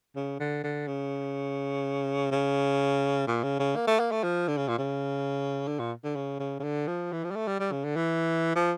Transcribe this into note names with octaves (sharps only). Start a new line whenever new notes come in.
C#3
D3
D3
C#3
C#3
A#2
C#3
C#3
A#3
A3
A#3
A3
F3
D3
C#3
A#2
C#3
D3
A#2
D3
C#3
C#3
C#3
D3
F3
E3
F3
G3
A3
G3
G3
C#3
D3
E3
F3